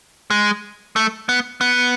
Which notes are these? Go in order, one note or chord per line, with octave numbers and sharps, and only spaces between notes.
G#3
A3
B3
B3